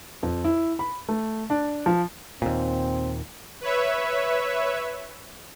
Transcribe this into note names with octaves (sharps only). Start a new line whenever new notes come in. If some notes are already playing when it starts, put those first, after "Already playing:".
F2
E4
B5
A3
D4
F3
D#2 A#2 C4
B4 C#5 E5